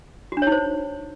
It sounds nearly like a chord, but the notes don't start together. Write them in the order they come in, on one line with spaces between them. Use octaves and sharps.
F#4 D4 C#5 D#4 C5